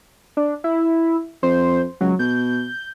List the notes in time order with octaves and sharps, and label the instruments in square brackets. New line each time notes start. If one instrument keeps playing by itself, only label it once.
[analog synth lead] D4
E4
[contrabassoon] F2 [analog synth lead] C5
[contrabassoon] C#2 [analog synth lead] F#3
[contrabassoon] B2 [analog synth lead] G6